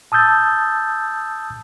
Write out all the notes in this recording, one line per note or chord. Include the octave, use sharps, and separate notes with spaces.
A5 D#6 E6 G6 A6